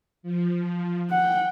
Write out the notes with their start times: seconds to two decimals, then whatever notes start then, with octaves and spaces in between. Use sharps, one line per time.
0.23 F3
1.11 F#5 G5